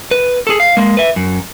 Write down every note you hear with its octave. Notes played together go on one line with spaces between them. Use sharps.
B4
G#4 A4
F5
G#3 A#3
B4 E5
F#2